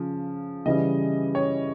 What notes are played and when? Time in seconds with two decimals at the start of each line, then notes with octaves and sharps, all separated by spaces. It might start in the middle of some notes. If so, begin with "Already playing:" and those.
Already playing: C#3 F3
0.66 C#3 E3 G3 D#5
1.35 C#5